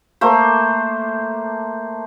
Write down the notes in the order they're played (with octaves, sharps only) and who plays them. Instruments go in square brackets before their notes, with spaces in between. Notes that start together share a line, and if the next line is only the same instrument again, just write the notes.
[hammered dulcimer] A3 A#3 C5